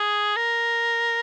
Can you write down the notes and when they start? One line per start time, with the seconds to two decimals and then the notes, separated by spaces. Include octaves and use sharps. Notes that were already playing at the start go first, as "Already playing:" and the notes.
Already playing: G#4
0.36 A#4